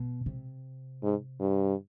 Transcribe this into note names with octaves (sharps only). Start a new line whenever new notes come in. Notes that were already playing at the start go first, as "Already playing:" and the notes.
Already playing: B2
C3
G#2
G2